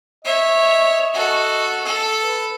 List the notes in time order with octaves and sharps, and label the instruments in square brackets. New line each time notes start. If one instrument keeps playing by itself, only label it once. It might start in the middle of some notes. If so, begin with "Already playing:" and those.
[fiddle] C#5 E5 [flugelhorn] D#5
[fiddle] F#4 A4
A4
[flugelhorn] B4